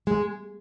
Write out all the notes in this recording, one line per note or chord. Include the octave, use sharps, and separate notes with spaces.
G#3